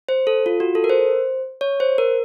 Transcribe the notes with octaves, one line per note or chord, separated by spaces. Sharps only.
C5
A4
F4
F#4
A4
A#4
C5
C#5
C5
A#4